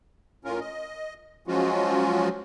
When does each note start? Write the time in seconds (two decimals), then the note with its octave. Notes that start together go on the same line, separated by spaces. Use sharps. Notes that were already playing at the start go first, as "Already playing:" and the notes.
0.45 A2 C#4 F4 A#4
0.60 D#5
1.47 F3 F#3 G#3 C#4 F4 F#4